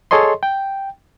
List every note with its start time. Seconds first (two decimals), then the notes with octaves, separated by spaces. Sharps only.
0.11 G#4 A4 C#5 D#5 C6
0.43 G5